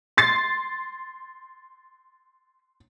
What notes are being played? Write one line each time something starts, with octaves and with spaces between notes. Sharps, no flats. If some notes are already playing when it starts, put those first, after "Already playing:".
C6 A6 C7